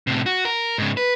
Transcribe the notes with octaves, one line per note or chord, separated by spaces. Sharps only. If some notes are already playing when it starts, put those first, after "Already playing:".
A2 C3
F#4
A#4
G#2 C#3
B4